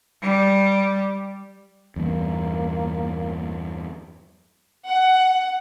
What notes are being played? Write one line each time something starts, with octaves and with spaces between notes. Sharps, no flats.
G3
E2 G2 A#3
F#5